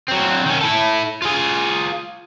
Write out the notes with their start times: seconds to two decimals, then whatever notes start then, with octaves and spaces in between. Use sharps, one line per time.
0.08 F#3 C4
0.46 D#3 C#4
0.61 E4 A4
1.22 F4 G#4